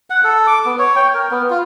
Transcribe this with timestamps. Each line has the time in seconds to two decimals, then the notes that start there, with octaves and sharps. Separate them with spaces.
0.10 F#5
0.24 A4
0.47 D6
0.65 B3
0.79 C#5
0.96 G5
1.14 A#4
1.31 B3
1.50 F4